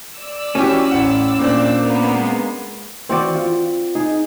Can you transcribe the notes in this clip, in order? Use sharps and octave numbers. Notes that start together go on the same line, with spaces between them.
D5 E6
E3 C#4 F#4 G4
A1 F#5
A#2 C4 D4
A#3 B3
G#3
E3 C4 F#4 D5
F4
D#4 G#4